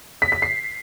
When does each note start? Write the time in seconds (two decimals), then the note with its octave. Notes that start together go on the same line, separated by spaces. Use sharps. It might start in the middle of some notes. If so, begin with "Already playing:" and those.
0.22 B6
0.32 B6
0.42 C7